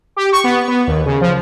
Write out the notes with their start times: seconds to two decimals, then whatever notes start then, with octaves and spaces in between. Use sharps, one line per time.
0.16 G4
0.33 C#6
0.44 B3
0.68 B3
0.87 D#2
1.06 C#3
1.21 F3